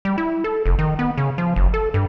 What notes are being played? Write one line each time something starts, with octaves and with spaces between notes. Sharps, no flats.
G3
E4
A4
F1
D#3
B3
C#3
F3
F#1
A4
G2